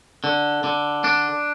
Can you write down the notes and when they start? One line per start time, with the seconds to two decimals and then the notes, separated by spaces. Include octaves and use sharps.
0.24 D3
0.64 D3
1.04 D4